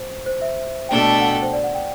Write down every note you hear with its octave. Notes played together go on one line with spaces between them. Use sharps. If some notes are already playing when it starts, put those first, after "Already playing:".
Already playing: C5
C5
E5
B2 A3 D4 A4 G5
A5
G5
F#5
G5
C5
D5
F#5
G5